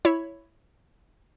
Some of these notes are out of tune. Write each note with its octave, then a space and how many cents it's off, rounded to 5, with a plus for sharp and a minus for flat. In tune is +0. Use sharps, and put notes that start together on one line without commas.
E4 +0 C#5 +0 B5 +0